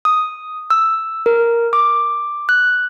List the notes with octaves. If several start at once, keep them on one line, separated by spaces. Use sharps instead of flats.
D#6
E6
A#4
D6
F#6